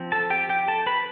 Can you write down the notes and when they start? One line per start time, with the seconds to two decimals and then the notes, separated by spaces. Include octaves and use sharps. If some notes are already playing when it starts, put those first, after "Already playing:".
Already playing: F3 C4
0.12 A4 A5
0.30 G4 G5
0.49 G4 G5
0.68 A4 A5
0.86 B4 B5